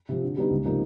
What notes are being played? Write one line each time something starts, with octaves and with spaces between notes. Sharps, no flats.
C3 F3
D3
G3 B3 D#4
C#2
C3 F3 A#3 D#4